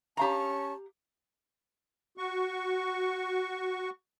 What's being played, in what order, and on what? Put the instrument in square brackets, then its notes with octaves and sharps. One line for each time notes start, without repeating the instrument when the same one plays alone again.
[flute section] C#4 A5 C#6 [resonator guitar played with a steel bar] G4 F5 A#5
[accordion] F#4 C#6